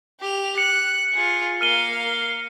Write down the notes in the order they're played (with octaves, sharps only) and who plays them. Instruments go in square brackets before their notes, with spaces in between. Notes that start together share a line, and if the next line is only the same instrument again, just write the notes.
[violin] G4 F7
[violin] F#6 [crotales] C#7
[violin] F4 G#4
[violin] A#3 F5 [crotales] F6 D#7 G7